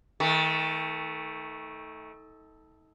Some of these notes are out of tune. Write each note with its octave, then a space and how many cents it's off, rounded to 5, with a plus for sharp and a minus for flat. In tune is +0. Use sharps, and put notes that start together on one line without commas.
D#3 +35 A3 +0